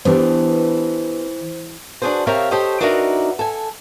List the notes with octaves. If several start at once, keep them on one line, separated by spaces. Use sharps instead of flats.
E3 B3 D4 G4 C5
D4 F#4 G#4 B4 C5
C3 C4 A#4 C#5 E5 F5
G4 A4 C5 C#5 D#5 G5
D4 D#4 F#4 A#4 B4 E5
A4 G#5